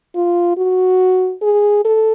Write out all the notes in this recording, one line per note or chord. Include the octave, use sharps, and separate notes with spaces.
F4
F#4
G#4
A4